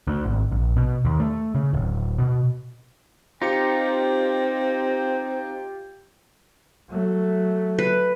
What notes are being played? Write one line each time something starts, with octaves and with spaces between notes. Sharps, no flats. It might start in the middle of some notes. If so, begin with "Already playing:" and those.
D2
G#1
A#1
B2
D#2
A3
C#3
D1
B2
C4 D#4 F4 G4 G5 C#7
F#3 A3
B4